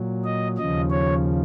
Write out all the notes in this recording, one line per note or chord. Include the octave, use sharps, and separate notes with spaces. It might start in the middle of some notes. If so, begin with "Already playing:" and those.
Already playing: A#2 F#3
D#5
D#2 C#3 F3 D#5
C#5